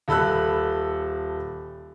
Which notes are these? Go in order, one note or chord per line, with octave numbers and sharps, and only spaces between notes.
D#1 A4 B5 E6 F#6